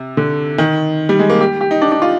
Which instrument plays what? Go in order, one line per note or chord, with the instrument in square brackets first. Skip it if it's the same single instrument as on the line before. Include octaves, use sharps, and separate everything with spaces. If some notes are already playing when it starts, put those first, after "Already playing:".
Already playing: [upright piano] C3
D3
D#3
G3
G#3
A#3
G4
G4
D#4
D4
D4
F4